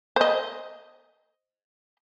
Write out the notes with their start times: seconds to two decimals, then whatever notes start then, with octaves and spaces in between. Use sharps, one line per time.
0.16 C5 D#5